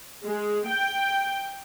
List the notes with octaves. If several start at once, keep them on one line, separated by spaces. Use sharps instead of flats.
G#3
G5